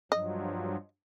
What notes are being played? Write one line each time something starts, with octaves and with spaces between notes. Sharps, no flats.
G2 F3 F#3 D#5